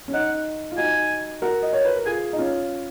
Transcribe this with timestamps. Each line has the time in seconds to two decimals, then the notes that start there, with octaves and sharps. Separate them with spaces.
0.08 C#4
0.13 D#4 F#5
0.72 F4
0.78 D#4 F#4 G#5
1.42 F#4 A#4
1.63 D#5
1.73 C#5
1.85 B4
1.95 A#4
2.06 F4 G#4 G#5
2.33 D#4
2.38 C#4 F4